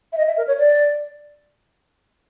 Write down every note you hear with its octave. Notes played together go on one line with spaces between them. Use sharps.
E5
D#5
E5
A#4
C#5
D5